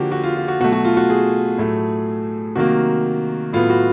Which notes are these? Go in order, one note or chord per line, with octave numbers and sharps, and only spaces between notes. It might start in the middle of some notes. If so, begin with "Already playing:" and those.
Already playing: D3 F3 A#3 F#4 G4
F#4
F4
F4
F#4
B2 F#3 A3 F#4
F#4
F4
F#4
G#4
A2 F#3 A3
C3 D#3 F#3 A#3 F#4
A2 F#3 B3 F4
F#4